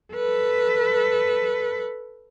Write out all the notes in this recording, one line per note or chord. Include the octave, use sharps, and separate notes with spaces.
A4 B4